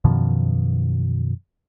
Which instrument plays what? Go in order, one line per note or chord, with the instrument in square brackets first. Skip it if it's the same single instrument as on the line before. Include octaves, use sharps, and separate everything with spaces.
[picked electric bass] F#2 B2 D#3 F3